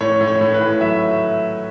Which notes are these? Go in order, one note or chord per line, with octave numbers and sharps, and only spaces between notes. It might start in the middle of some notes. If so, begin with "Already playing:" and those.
A2 C#5
A2
C#5
A2
B4
A2
F#3 E5